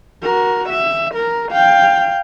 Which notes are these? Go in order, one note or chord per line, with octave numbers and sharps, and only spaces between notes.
F#4 A#4
E5
A#4
F5 G5